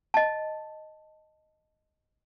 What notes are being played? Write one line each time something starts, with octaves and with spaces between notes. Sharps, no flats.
D#5 A5